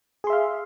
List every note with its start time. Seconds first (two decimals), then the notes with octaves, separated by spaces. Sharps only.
0.24 G#4
0.27 C6
0.30 E5
0.33 F5